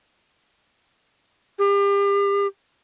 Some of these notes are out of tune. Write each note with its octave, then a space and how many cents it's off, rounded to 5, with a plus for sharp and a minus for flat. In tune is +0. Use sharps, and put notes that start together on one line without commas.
G4 +35